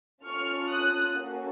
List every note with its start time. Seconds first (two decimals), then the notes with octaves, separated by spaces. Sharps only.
0.23 C#4 F4 A4 C#6 F6
0.70 D#6 F#6
1.18 A#3 C#4 F#4 A4